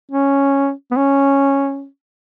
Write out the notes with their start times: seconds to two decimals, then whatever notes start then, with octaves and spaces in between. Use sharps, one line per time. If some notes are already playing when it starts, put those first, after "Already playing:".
0.12 C#4
0.91 B3
0.97 C#4